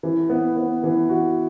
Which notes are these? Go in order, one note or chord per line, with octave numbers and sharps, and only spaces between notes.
E3
B3
B3
E3
F#4